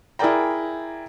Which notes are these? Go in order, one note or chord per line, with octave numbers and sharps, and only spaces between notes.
E4 G#4 A#4 D5 G5 A#5